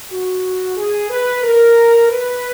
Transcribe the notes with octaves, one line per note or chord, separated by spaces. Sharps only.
F#4
G#4
B4
A#4
B4